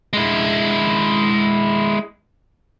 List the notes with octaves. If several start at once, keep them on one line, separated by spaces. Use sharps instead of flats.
G#3 E4